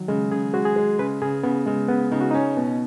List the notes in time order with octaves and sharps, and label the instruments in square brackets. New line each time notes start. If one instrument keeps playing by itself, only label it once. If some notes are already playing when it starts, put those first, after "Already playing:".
Already playing: [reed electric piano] D#3 F#3
[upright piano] C#3 [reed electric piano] G#3
[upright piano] C#3 [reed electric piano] G#4
[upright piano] G#3 [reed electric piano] F#4
[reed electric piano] G#4
[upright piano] G#3
[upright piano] C#3 [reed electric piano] B4
[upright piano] C#3 [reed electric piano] G#4
[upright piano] C#3 [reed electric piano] B3
[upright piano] C#3 [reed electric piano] G#3
[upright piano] C#3 [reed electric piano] B3
[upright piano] C#3 [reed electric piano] D#4
[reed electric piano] F#4
[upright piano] C#4 [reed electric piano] D#4
[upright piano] B2